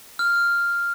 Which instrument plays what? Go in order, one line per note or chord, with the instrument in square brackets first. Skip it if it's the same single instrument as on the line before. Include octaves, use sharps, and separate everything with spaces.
[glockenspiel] F6